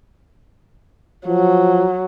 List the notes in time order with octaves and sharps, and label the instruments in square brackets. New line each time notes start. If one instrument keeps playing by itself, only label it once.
[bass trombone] F3 [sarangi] F#3